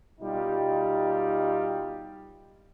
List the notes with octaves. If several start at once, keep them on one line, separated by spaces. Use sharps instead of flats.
B2 G3 D#4 F4